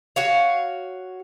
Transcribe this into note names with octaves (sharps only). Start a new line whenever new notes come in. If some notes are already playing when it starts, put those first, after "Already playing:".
F#4 C#5 F5